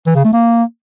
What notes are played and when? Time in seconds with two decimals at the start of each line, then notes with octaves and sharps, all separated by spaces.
0.07 E3
0.16 C#3
0.24 A3
0.33 A#3